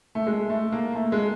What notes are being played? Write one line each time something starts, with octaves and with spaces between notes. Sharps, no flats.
A3
G#3
A3
A#3
A3
G#3